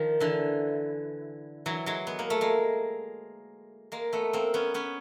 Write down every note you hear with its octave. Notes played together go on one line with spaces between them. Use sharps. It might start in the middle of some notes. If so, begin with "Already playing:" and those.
Already playing: D#3 F3
D3 E3
E3 F#3
F#3 G#3
B3
A#3
A3
G#3 A#3
G#3 A#3
A3 B3
A#3 C4
B3 C#4
B3 C#4